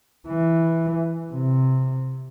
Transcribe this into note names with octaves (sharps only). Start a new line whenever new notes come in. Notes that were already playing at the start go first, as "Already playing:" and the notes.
E3
C3